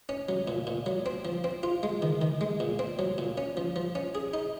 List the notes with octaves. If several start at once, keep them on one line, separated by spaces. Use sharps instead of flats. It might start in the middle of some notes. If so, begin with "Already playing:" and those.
C#4
F#3
A#2
A#2
F#3
C4
F3
C4
F4
G#3
D#3
D#3
G#3
A#2
C4
F#3
A#2
C#4
F3
F3
C#4
G#4
D#4